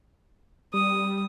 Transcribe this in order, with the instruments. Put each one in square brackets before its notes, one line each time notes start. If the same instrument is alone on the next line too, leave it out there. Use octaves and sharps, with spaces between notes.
[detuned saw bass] G3 [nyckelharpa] D#6